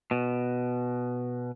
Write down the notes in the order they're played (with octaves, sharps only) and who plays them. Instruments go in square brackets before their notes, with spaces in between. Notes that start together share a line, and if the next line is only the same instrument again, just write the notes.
[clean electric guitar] B2